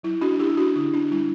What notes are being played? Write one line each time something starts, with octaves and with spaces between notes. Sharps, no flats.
F#3 E4
D4 F#4
C#4 E4 G4
D4 F#4
D3 E4
D4
G3 E4